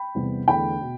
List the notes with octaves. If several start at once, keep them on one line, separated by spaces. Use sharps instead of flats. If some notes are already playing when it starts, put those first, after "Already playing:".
Already playing: G5 B5
E2 C3 G3 B3
E2 D3 A3 G5 B5
B2